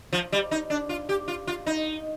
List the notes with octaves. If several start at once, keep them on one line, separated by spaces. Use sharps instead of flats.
F3
G3
D#4
D4
F4
G4
F4
F4
D#4